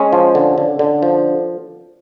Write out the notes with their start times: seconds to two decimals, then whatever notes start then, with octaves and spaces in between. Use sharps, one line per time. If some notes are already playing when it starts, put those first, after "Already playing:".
Already playing: G#3 C#4
0.13 F3
0.35 D3
0.58 D3
0.79 D3
1.03 F3